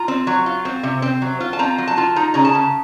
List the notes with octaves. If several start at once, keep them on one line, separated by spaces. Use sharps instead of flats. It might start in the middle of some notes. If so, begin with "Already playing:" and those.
Already playing: F4 A#5
C4
F#3
F4
C4
C3
C4
F#3
F4
A5
C4 A#5
F#3
A5
F4
D#4 A#5
C#3 A#5
A5
C#3